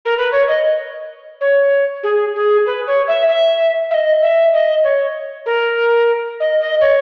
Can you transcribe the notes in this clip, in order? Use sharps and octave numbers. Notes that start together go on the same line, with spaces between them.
A#4
B4
C#5
D#5
C#5
G#4
G#4
B4
C#5
E5
E5
E5
D#5
E5
D#5
C#5
A#4
D#5
D#5
C#5